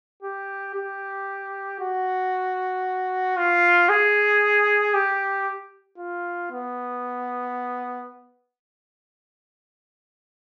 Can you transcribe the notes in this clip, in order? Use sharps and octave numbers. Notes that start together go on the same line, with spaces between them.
G4
G4
F#4
F4
G#4
G4
F4
B3